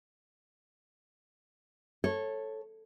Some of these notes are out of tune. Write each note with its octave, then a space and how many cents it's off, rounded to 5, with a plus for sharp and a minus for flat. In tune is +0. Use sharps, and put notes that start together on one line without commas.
A4 +0 C#5 -20